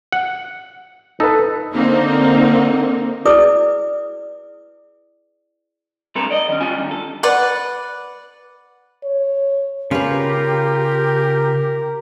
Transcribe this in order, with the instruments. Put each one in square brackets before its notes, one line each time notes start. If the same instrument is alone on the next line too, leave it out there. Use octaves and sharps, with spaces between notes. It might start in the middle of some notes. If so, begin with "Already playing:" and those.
[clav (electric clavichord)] F#5
[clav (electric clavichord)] D#4 [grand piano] A4 B4
[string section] D3 A#3 C4 D#4
[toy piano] E4 G#4 B4 D5 D#6
[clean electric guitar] G2 C3 C4 A4 B4 A#5
D5 D#5
D#3 C#4
G3 C#4 F4 G#5
G2 D#3
A4
[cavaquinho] B4 D5 F#5
[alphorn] C#5
[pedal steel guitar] C#3 F4 [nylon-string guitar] C#4 B4 [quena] G4 [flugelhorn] A#4